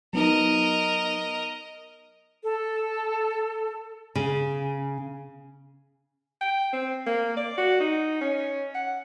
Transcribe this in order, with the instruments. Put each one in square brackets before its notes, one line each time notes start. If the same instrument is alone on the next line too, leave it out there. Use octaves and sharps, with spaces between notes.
[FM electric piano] F#3 B3 D#4 [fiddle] A#4 D#5
[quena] A4
[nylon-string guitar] C#3
[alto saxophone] G5
C4
A#3
D5
F#4
D#4
C#4
F#5